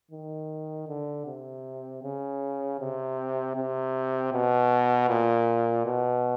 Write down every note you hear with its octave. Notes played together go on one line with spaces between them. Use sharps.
D#3
D3
C3
C#3
C3
C3
B2
A#2
B2